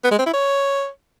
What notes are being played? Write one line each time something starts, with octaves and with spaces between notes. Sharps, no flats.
B3
G#3
C4
E4
C#5